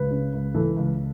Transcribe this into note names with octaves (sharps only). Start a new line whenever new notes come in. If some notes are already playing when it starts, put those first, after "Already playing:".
Already playing: C#2 B4
C#3
C#2
E3 A4
C#2